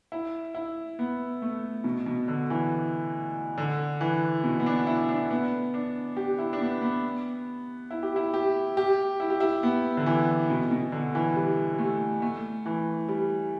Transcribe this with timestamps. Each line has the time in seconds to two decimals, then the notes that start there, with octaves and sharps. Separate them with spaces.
0.12 E4
0.55 E4
0.99 B3
1.42 A3
1.84 B2
2.06 B2
2.28 D3
2.50 E3
3.58 D3
4.01 E3
4.44 B2
4.60 B3
4.66 D4
4.87 E4
5.09 D4
5.30 B3
5.74 D4
6.17 G4
6.39 E4
6.53 D4
6.61 B3
6.82 B3
7.91 E4
8.03 G4
8.16 E4
8.34 G4
8.77 G4
9.20 E4
9.30 G4
9.40 E4
9.63 B3
9.97 D3
10.06 E3
10.50 B2
10.71 B2
10.92 D3
11.15 E3
11.36 G3
11.73 G3
11.79 A3
12.22 A3
12.66 E3
13.09 G3